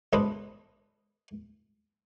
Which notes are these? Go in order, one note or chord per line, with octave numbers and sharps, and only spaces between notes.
B1 G#2 D4 B4 C5 D#5